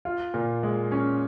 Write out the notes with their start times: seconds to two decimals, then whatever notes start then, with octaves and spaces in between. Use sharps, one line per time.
0.05 F4
0.34 A#2
0.63 G#3
0.92 C#4